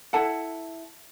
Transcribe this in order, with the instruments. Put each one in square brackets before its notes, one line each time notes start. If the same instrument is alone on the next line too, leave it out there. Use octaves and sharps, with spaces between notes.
[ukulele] E4 A4 F#5 A5